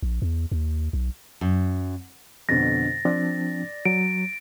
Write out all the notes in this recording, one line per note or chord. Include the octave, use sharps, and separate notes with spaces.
A#1
E2
D#2
B1
F#2
F2 B2 D3 A6 A#6
F3 C4 D4 D5
F#3 D7